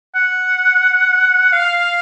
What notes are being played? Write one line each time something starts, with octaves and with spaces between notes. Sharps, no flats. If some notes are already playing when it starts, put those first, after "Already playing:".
F#5
F5